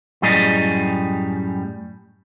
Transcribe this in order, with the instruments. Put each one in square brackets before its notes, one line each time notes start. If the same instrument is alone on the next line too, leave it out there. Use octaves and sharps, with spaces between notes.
[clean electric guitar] F#2 A2 G3 G#4 D#5